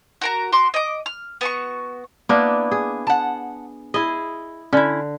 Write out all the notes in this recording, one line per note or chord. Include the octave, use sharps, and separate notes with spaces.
F#4 A#4 A#5
F#4 C6 D6
D#5 D6
F6
B3 F#4 C#6
A#3 B3 D4 E4
G#4
F#5 A5
E4 G#4 D#5
D3 C#4 E4